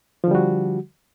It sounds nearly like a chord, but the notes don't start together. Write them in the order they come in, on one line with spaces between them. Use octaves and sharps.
F3 D3 G3 F#4